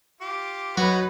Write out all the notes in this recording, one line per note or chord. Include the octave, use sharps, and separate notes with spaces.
F4 G4 D6
F#3 D#4 F#4 B4 C#5 F#5